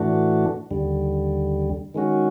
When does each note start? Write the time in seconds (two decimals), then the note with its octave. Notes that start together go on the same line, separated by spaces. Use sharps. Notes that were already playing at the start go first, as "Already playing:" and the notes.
Already playing: A2 E3 A3 D4 F#4
0.71 D#2 D3 G3
1.94 D#3 G#3 C#4 F#4